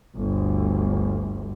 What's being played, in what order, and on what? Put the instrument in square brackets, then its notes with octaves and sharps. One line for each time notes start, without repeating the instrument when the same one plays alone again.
[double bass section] G1 D2